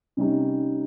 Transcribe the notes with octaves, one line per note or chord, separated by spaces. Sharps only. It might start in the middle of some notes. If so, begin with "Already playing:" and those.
C3 G3 C#4 D#4